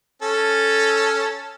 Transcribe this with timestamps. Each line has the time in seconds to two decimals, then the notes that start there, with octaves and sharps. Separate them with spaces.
0.22 C#4 A4